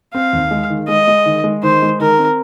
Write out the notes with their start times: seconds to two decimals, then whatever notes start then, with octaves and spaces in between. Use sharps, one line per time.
0.14 C4 F5
0.33 D#2
0.51 G#3
0.70 D#3
0.88 G#3 D#5
1.08 G#3
1.26 D#3
1.44 G#3
1.63 D#3 C5
1.82 G#3
2.00 D#3 A#4
2.18 C4